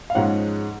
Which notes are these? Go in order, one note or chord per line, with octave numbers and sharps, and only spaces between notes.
F5
G#2 F3 G#3 C#4 F#5